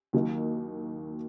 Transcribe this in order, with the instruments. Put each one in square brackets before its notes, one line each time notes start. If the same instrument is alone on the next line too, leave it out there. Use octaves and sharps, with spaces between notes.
[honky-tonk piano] D#2 D#3 F#3 A#3 D#4